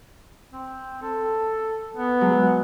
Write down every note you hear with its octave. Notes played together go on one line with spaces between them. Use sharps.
C4
A4
B3
F#3 G#3